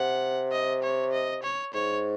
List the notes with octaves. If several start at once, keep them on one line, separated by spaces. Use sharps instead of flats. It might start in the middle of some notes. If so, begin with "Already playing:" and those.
Already playing: C3 F#5
D#5
C#5
D#5
C#5
G#2 C#5